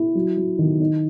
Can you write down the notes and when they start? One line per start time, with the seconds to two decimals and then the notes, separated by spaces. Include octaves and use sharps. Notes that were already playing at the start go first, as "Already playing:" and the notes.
Already playing: E4
0.15 F#3
0.37 F#3
0.59 D#3
0.80 D#4